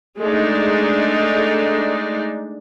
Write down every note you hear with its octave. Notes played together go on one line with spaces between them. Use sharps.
G#3 A3 D4 D#4